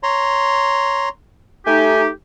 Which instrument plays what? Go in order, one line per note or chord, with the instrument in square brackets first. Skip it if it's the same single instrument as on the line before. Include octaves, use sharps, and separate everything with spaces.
[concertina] C#5 A#5 C6
[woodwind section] A3 D#4 G4 [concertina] G#5